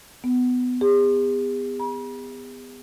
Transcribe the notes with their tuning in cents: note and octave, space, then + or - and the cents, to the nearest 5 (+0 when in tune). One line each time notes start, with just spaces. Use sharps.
B3 +20
G#4 -45
B5 -45